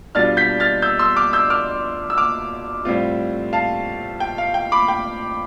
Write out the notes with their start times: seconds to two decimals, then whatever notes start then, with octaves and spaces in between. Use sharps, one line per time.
0.15 B2 G3 D4 F4 F6 A6
0.37 G6 B6
0.60 F6 A6
0.82 E6 G6
0.99 C6 E6
1.17 D6 F6
1.33 E6 G6
1.50 D6 F6
2.10 E6
2.18 D6 F6
2.85 A2 G3 C4 F4
3.53 F5 A5
4.20 G5
4.38 F5
4.54 G5
4.72 B5 D6
4.88 G5